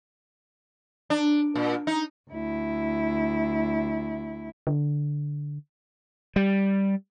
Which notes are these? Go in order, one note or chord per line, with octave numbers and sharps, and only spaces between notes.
D4
A#2
D#4
D2 E4
D3
G3